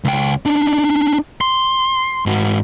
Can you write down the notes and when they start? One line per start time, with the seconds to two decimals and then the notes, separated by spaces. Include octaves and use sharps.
0.05 C#2 G5
0.46 D4 D#4
1.41 C6
2.26 G#2 F#4